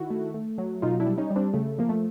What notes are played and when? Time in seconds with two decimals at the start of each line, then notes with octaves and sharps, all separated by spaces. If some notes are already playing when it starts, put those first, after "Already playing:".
Already playing: D#3 E4 F#4
0.10 A3
0.34 A3
0.58 F#3
0.82 B2 D#4 F4
1.00 D4 E4
1.06 G3
1.18 C#4 D#4
1.30 G3
1.36 C4 D4
1.54 C#3 A3
1.78 F3 A#3
1.89 A3